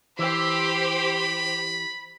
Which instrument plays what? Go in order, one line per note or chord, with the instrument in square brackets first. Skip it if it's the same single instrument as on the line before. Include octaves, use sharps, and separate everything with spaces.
[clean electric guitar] E3 [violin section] G4 C5 [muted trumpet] B5